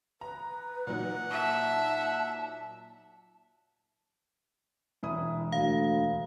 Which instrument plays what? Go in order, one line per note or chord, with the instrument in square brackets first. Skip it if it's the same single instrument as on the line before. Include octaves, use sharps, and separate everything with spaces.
[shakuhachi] B4 [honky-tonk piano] A#5
[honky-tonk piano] A#2 F#3 D#4 [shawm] F#5
[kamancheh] E5 [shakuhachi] A5
[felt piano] E1 E4 D#6
[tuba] D2 [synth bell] F5